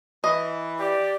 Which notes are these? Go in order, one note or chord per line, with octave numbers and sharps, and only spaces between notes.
E3 D#5
G4 D5